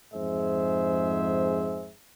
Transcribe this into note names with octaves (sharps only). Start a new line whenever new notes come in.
F2 G#2 G#4 C5 E5